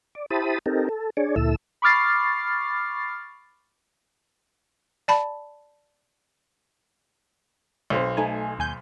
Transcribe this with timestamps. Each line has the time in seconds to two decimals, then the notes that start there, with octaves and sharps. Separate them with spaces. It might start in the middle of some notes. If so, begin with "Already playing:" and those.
0.15 D5
0.30 E4 G4 C5 A5 B5 D#6
0.66 C4 D#4 G4 A4 A#4
0.89 A4
1.17 D4 G#4 C#5 D5
1.36 D2 A#2 E4 A4 E6
1.82 B5 C#6 D6 F6 A6 C7
5.08 D5 A5 B5
7.90 B1 C4
8.17 A3 D#4 G#5
8.59 D#2 G#5 G6